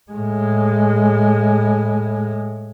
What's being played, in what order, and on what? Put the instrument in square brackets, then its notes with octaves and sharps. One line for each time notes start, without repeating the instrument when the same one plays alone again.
[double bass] A2 G#3